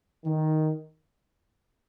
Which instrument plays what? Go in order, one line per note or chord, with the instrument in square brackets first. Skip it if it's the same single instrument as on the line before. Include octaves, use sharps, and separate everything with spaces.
[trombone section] D#3